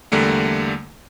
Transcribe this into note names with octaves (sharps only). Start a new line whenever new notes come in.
E2 D3 G3 A3 A#3